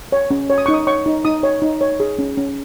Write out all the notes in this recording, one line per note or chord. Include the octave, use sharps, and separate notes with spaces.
C#5
C#4
C#5
D#6
D#4 C#6
D#6
C#5 C#6
D#4
D#4 D#6
C#5
D#4
C#5
G#4
C#4
C#4